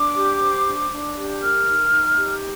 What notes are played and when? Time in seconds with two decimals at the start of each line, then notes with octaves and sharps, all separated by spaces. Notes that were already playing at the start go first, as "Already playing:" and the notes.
Already playing: D4 D6
0.16 G4
0.41 C5
0.66 D4
0.91 D4
1.16 G4
1.41 A#4 F6
1.67 D#4
1.91 D#4
2.16 G4